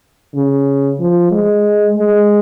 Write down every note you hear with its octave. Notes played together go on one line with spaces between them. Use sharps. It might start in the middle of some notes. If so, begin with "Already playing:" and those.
C#3
F3
G#3
G#3